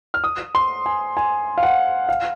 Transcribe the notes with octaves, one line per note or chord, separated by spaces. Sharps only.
F6
D#6
C6
G#5
G#5
F5
F#5
F5